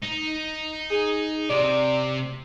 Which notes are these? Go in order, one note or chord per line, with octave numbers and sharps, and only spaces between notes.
D#4
G#4
C3 D5